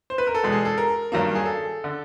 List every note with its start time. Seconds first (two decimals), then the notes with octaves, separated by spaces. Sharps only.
0.10 C5
0.18 B4
0.27 A#4
0.35 A4
0.43 E2 B2 G#3
0.52 G#4
0.65 A4
0.78 A#4
1.12 G2 D#3 F#3 A#3
1.35 G#4
1.45 A4
1.84 D3